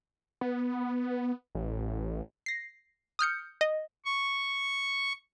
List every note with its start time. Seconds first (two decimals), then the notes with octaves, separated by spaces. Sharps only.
0.41 B3
1.55 A1
2.46 A#6 C7
3.19 D#6 F6 G6 C#7
3.61 D#5
4.05 C#6